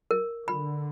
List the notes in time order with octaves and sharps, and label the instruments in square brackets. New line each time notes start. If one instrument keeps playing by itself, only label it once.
[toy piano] A#4
[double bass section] D3 [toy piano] B5